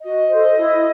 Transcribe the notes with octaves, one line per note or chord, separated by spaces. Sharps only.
F#4 D#5
A4 C5
E4